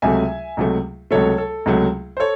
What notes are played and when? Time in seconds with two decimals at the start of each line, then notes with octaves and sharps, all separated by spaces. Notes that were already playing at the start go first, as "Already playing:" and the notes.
0.02 C#2 C3 F#3 A3 E5 G#5
0.57 C#2 C3 F#3 A3
1.11 C#2 C3 F#3 A3 A4 C#5
1.38 A4
1.66 C#2 C3 F#3 A3
2.17 C5
2.20 A4 C#5